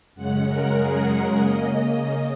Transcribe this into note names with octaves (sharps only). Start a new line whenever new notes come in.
F#2 C#3 G#3 C#4 F#5
A#4
G#4
A#4
C#3 A#3 C#4 D#5